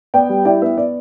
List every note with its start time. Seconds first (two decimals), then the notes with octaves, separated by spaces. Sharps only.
0.14 B3 D5 G5
0.29 G3
0.45 E4 D5 G5
0.62 B3 E5
0.77 B3 D5